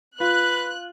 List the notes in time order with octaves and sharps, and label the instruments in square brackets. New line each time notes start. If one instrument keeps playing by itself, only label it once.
[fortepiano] F4 [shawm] B4 [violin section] F#6